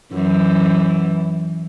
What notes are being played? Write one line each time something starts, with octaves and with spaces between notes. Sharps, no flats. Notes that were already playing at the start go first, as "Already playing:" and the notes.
F#2 E3